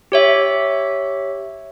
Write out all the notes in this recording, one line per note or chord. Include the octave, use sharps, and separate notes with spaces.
G4 C#5 E5